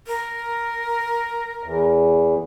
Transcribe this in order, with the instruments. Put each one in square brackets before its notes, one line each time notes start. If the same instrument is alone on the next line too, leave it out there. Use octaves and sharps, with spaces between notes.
[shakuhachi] A#4
[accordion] E2